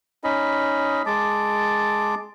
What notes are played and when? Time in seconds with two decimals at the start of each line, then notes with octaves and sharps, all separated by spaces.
0.24 C#4 D#4 D#5 B5
1.06 G#3 A5 D6